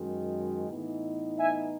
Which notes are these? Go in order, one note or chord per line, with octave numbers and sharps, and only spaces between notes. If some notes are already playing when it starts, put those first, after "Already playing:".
Already playing: F#2 D#3 G#3
A2 E3 B3 D#4
E5 G#5